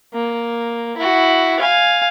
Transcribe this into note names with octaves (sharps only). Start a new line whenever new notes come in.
A#3
E4 F#4
F5 G#5